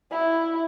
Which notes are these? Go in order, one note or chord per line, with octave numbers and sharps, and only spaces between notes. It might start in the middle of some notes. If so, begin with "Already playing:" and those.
E4